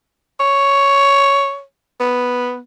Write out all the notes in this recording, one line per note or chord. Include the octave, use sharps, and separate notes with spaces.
C#5
B3